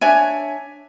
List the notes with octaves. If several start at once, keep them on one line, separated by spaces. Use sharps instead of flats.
D4 C#5 E5 G#5